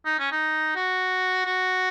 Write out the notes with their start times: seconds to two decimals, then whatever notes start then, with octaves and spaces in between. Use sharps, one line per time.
0.05 D#4
0.19 C#4
0.32 D#4
0.75 F#4
1.46 F#4